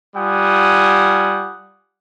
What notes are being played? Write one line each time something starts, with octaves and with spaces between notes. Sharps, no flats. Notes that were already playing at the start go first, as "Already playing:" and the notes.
G3 F4 F#5 G#5 D#6